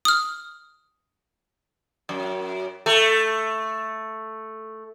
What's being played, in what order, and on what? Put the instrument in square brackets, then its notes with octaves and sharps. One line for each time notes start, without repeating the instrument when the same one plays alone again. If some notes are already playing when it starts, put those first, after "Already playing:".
[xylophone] D#6 F6
[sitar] F#2
A3